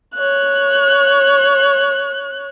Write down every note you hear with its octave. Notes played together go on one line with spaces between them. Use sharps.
C#5 F#6